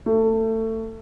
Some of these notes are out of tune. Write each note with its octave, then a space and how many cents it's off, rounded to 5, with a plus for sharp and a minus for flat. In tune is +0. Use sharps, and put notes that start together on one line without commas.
A3 +20